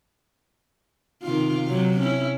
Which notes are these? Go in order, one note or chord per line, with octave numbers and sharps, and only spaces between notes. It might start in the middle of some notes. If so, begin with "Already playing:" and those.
C3 D#3 F4
C3 F#3
C#4 E4